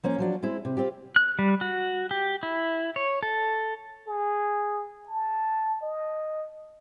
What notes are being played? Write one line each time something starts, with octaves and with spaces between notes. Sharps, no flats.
F3 A#3 C#4
F3 F#3 D4
G#3 C4 E4
C3
C4 F4 G4
F#6
G3
F#4
G4
E4
C#5
A4
G#4
A5
D#5